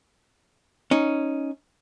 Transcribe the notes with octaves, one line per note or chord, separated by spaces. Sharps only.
C#4 D#4